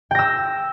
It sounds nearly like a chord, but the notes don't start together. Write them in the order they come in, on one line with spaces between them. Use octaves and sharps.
G5 A#6 E6